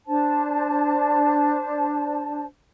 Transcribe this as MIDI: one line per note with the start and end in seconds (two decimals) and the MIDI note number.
0.07 2.44 62
0.07 2.44 72
0.07 2.44 81